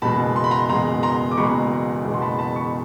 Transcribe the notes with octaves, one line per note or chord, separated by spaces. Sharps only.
F#1 E2 B2 G#3 A5 B5
C6
B5
A#5 C6
F#1 E2 B2 G#3 A#5 C6
A#5 C6
D6
F#1 E2 B2 G#3 B5 C#6
F#1 E2 B2 G#3
C6
A5 B5
A5 B5
B5 C#6